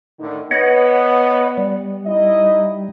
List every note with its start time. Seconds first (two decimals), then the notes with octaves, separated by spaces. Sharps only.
0.19 A2 D3 D#3
0.51 B3 C#5 D#5 F#5
1.58 G3
2.06 D#4 E4 D#5